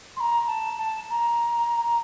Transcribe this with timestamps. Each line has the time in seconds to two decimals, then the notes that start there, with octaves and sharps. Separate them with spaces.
0.16 C6
0.20 A#5
0.47 A5
0.78 A5
1.10 A#5